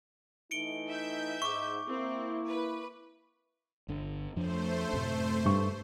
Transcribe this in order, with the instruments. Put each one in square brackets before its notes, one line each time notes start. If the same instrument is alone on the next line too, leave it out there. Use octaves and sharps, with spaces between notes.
[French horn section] E3 A3 D#4 [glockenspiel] C#7 D7 G7
[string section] E5 G6
[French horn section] G#2 [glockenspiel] C#6 D6
[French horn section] A#3 E4 [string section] C4
[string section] B4
[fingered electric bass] G1 D3
[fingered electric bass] F2 F3 D4 [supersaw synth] A3 C5
[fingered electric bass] F#2 A2 C3
[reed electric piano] G2 C#6